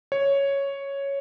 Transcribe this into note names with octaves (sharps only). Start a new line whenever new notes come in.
C#5